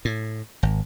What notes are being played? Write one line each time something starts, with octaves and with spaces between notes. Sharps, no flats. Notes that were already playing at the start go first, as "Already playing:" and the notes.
A2
G#1